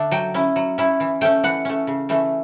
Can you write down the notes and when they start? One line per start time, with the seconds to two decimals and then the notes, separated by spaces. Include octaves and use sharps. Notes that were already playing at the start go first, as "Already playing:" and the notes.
Already playing: D3 A3 D4 E5
0.11 F#3 G5
0.34 C#4 E4
0.56 F#3
0.78 C#4 E4
1.00 E3
1.21 A3 C#4 G5
1.44 E3 F#5
1.65 A3 C#4
1.87 C#3
2.09 E3 A3 C#4